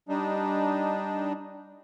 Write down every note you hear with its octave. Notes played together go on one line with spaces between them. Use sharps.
G3 D4 D#4